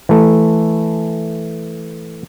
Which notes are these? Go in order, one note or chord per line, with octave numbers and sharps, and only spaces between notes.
E3 A3